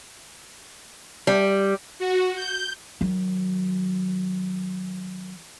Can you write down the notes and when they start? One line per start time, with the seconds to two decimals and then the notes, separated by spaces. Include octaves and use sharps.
1.27 G3
1.99 F#4
2.35 G6
3.01 D#3 F#3